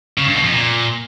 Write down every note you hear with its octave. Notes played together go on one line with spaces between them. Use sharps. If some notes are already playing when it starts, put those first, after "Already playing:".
C#3
G2
B2
F2
A#2